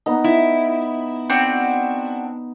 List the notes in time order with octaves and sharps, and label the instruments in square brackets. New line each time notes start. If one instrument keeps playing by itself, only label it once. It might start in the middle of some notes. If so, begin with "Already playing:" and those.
[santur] B3 D#4
[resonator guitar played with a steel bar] E4
[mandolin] C4 D4 F#4